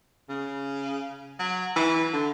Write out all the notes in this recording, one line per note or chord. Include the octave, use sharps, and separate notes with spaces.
C#3
F#3
E3
D3